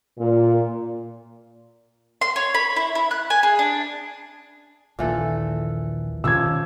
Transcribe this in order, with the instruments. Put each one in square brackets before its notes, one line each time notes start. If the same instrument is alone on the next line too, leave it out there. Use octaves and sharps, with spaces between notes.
[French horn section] A#2
[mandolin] C6
C#5
B5
E4
E4
F#6
G#5
G#4
D4
[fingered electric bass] A#1 D#2 [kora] A#2 E3 A4
[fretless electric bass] B2 D#3 C#4 [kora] F3 G4 [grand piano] E6 G#6